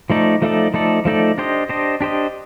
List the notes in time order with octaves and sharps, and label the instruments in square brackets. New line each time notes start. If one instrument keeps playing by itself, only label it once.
[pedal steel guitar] F3 A3 D#4 A4 D5
F3 A3 D#4 A4 D5
F3 A3 D#4 A4 D5
F3 A3 D#4 A4 D5
D4 G4 C5 D#5
D4 G4 C5 D#5
D4 G4 C5 D#5